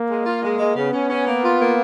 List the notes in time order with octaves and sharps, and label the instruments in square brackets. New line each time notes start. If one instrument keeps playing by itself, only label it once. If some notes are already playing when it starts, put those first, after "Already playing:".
Already playing: [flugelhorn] A#3
[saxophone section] G#3
F4
G#3
G#3
[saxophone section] C#3 [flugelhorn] B3
[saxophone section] C#4
C#4
A#3
F4
A#3